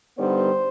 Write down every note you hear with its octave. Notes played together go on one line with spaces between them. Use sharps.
G2 D3 G3 B3 D#4 C5